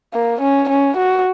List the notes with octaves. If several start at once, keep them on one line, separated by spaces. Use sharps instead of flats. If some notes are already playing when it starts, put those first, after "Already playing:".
A#3
C#4
C#4
F#4